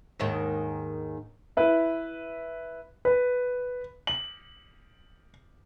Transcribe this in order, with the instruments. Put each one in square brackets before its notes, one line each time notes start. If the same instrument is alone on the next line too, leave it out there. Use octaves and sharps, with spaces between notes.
[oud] D#2 G#2 D#3
[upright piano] E4 B4 E5
[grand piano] B4
F#7